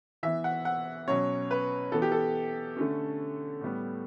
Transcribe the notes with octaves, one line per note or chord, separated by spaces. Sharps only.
E3 B3 E5
F#5
F#5
B2 F#3 C#4 C#5
B4
E3 B3 A4
G4
A4
D3 A3 C#4
A2 G3 B3